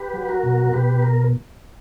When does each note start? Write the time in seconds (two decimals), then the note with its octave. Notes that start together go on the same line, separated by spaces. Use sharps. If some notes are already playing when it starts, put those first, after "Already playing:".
Already playing: G4 B4
0.14 F#3
0.28 F#4 A#4
0.43 B2
0.73 B2 G4 B4
1.02 A#4